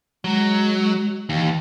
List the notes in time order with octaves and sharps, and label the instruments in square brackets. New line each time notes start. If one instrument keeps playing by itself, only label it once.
[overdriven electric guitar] F#3 [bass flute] G#3
[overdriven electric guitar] D#2 [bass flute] E3